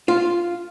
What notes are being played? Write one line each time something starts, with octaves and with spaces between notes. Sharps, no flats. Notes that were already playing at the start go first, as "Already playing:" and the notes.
F4